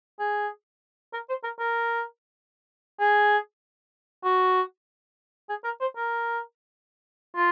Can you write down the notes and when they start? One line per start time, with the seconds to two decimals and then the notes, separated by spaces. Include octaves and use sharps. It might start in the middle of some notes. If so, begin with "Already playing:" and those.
0.20 G#4
1.13 A#4
1.29 C5
1.44 A#4
1.59 A#4
3.00 G#4
4.24 F#4
5.49 G#4
5.65 A#4
5.81 C5
5.96 A#4
7.36 F4